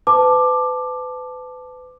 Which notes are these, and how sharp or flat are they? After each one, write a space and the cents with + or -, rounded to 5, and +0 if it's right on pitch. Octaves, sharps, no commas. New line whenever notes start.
B4 +35 A5 -5 D6 +15